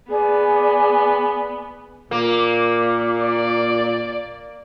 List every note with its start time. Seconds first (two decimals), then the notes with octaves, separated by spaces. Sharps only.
0.11 B3 G#4 D5 G#5
2.11 A#2 A#3 D6
3.24 D5